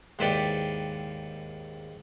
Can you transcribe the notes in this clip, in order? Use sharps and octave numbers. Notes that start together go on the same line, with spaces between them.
D#2 G#2 E4 B4 D5 G5